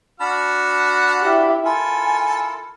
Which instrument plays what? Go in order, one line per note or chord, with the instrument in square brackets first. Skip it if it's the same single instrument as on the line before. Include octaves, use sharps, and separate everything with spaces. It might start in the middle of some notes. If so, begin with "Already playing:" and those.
[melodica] D4 A5 B5 [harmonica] F#4 F6
[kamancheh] E4 G4
[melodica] E4 F4 A#4 [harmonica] A4 [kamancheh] G#5